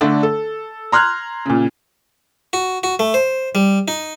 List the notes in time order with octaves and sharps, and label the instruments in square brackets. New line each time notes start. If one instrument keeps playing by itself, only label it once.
[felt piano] D3 A3 D4 D5
A4
A#5 C6 F6 F#6 G#6
A#2 C#3
[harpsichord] F#4
F#4
A3
C5
G3
D#4